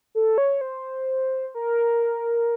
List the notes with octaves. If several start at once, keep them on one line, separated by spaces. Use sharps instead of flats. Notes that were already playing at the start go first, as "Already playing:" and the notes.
A4
C#5
C5
A#4